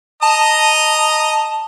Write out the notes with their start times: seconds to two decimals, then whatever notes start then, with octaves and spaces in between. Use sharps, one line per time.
0.23 D#5 A5 A#5 D#6